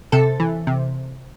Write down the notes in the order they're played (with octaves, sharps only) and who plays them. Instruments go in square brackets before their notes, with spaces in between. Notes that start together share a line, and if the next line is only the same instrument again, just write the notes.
[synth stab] C3 A4
E3
C3